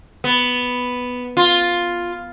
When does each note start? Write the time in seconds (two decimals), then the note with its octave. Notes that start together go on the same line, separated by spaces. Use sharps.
0.24 B3
1.37 F4